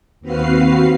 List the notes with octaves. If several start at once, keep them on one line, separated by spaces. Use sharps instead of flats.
D#2 C4 F#4 B4 F5 C7